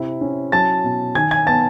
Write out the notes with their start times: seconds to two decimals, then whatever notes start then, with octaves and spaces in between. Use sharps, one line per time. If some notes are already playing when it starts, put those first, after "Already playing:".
Already playing: C3 E4
0.21 C#4
0.52 F#3 A5 A6
0.84 B2
1.15 D#3 G#5 G#6
1.31 G#5 G#6
1.46 B3 A5 A6